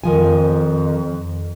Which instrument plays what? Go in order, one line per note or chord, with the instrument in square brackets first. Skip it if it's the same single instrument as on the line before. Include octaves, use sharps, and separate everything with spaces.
[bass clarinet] F2 [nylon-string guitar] D#3 F3 G#5